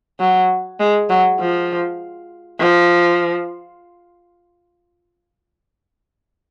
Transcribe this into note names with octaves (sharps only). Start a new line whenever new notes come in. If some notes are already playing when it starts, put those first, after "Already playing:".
F#3
G#3
F#3
F3
F3